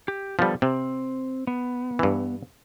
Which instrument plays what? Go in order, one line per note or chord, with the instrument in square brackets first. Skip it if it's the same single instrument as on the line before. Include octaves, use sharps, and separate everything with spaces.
[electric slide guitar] G4
[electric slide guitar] D3 B3 A4 [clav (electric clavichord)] F3 G3
[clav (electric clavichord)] C3 [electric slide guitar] C4
[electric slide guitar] B3
[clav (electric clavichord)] G2 E3